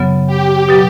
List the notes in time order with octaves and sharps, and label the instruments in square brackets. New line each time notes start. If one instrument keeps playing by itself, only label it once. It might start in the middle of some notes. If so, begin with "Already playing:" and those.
Already playing: [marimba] F#2 C#3 F#3 B3
[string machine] G4
[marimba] B2 F#3